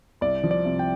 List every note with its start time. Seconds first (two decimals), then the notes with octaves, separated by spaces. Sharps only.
0.21 C2 D5
0.43 F3
0.51 D5
0.65 C3
0.79 G5